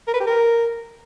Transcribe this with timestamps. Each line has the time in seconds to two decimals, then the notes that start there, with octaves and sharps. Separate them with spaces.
0.07 A#4
0.14 B4
0.20 G4
0.27 A#4